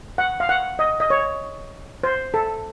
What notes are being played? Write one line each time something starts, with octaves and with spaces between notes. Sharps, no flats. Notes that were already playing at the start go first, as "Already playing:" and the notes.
F#5
F5
F#5
D#5
D#5
C#5
C5
A4